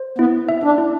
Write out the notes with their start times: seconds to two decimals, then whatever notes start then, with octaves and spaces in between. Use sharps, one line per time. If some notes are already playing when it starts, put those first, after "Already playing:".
Already playing: C5
0.18 B3 E4
0.49 E5
0.64 D4
0.78 E4